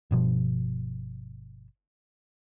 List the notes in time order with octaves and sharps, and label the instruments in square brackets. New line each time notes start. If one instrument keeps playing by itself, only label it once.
[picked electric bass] G1 B2 F3